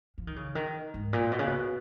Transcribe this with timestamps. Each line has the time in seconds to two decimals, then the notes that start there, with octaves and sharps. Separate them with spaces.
0.18 F3
0.27 D#3
0.36 C#3
0.55 D#3
0.94 G#2
1.13 A#2
1.32 B2
1.39 C#3
1.47 B2